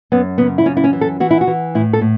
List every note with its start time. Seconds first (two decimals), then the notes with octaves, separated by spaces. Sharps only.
0.12 F#2 B3
0.38 C#3 B3
0.58 E4
0.66 F#2 C#4
0.77 E4
0.84 C#4
0.93 E3
1.01 A4
1.20 E3 F#4
1.31 E4
1.41 F#4
1.47 E3
1.75 A2 E4
1.93 A4
2.01 A2